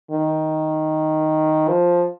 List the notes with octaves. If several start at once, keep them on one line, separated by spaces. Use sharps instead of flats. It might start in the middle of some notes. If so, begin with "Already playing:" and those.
D#3
F3